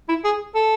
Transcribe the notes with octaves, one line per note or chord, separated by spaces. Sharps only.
E4
G#4
A4